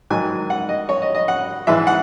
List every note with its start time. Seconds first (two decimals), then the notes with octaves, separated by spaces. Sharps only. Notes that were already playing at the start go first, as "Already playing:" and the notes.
0.10 G#2 D#3 F#3 G#5
0.50 F#5
0.69 D#5
0.89 C#5
1.02 D#5
1.15 D#5
1.28 F#5
1.67 G#2 E3 G#3 E5
1.87 F#5